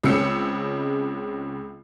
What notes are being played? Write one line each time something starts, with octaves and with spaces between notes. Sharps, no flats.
C#2 C#3 G#3 C4 E6 C#7